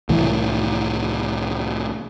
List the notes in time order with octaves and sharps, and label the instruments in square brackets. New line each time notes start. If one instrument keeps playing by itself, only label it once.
[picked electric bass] C2 A2 E3